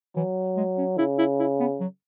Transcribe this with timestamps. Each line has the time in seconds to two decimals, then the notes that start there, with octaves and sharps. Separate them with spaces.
0.16 E3 F#3
0.57 G#3
0.78 C#4
0.98 C#3 E4
1.18 E4
1.39 E4
1.60 B3
1.80 F#3